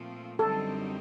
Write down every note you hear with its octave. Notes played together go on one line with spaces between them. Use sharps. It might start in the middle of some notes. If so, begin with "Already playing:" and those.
Already playing: A#2 F3 A3 C4
F#2 D3 G3 C4 D#4 A4